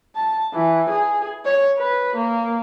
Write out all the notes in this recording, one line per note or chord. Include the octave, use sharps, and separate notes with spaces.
A5
E3
G#4
C#5
B4
A#3